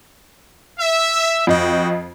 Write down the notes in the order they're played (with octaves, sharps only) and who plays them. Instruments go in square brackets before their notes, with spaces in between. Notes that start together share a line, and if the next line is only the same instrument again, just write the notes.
[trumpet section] E5
[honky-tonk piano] F2 D#5 [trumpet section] F#4 F5 G5